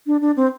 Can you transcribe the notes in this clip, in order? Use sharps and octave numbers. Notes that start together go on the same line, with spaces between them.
D4
D4
C4